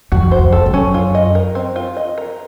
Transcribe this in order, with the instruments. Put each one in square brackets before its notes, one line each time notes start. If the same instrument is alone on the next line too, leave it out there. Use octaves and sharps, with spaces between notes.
[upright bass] F2 [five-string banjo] F#4
[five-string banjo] C5
[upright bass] F2
[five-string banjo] A4
[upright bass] F#2
[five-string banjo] C#4
F4
D#5
A#4
C4
F4
D#5
A#4